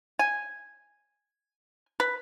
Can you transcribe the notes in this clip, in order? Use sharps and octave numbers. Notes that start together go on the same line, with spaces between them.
G#5
B4